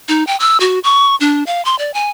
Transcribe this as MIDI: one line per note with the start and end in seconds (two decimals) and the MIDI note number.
0.09 0.26 63
0.27 0.37 79
0.40 0.58 88
0.60 0.79 66
0.84 1.16 85
1.20 1.44 62
1.47 1.63 77
1.65 1.77 84
1.79 1.93 74
1.94 2.10 80